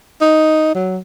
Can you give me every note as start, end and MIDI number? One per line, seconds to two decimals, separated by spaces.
0.21 0.74 63
0.75 0.98 54